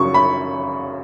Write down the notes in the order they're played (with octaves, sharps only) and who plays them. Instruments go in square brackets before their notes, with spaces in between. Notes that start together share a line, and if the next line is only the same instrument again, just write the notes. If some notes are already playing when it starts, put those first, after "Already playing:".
Already playing: [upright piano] F#2 C#3 F#3 C#6
B5